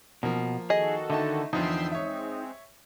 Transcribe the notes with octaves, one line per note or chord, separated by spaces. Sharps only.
B2 F3 A#3
D#3 F#4 G#4 A4 D#5
D3 A3 D#4 A5
E2 D3 F3 D#4 E5 G5 C6
G#3 C4 C#5 E5